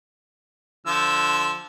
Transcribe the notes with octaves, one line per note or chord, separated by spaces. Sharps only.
D3 F3 E6